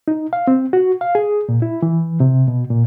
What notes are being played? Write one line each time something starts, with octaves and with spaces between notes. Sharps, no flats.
D#4
F5
C4
F#4
F5
G#4
A#2
E4
E3
C3
B2
A#2